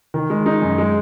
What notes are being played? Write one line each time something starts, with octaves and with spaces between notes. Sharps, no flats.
D#3
G#3
D#4
F#2
G#3